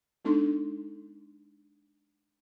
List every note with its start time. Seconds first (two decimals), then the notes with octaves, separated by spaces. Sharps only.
0.25 G#3 B3 D4 D#4 A4 C6